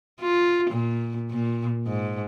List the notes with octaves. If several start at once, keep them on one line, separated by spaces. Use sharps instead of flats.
F4
A#2
A#2
G#2